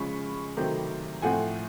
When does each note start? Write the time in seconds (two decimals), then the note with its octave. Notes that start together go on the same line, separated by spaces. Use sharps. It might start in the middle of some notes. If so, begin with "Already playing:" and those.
Already playing: C#3 F3 G#3 B5 C#6
0.57 C3 D#3 F#3 A3 C4
1.22 A2 F3 A3 C4 F#5 G#5